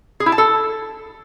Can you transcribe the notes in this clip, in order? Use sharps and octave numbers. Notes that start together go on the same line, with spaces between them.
G#4
E4
A5
A4